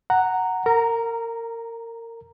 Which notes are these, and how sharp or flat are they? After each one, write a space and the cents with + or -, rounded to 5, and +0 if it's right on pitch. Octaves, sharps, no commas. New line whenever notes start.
F#5 +5 A#5 -10
A#4 -25 A#5 +0